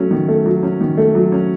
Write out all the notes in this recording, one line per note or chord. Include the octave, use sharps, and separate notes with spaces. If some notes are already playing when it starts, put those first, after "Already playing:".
Already playing: F#3 A3 C#4
D#3
A3
F#3
C#4
D#3
A3
F#3
C#4